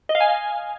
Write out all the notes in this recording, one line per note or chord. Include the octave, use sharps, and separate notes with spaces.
D#5
F5
G#5